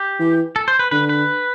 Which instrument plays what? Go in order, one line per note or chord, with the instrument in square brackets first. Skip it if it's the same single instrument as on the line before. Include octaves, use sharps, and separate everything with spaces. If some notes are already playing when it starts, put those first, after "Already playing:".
Already playing: [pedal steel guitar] G4
[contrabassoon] E3
[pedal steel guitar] A4
C5
B4
[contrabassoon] D3 [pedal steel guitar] B4
[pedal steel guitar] B4